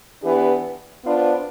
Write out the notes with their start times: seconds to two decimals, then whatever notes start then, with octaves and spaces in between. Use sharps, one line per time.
0.23 E3 B3 D4 G4
1.04 B3 D4 F4 C5